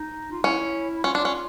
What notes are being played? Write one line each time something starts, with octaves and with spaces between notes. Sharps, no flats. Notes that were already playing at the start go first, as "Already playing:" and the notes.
Already playing: D#4
F4
C#4 E4
C#4 F4
D4
F4
C#4